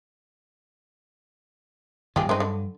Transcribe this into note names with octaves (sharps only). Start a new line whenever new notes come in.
G1 D#2 C3 F4 G4 G#4
G2 F#3 G#3 C4 D#4
D3